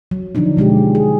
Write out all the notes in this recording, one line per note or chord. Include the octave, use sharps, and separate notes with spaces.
F#3
D3 F3 F#3 D4 D#4
B2 G#3 B3 G4
G#4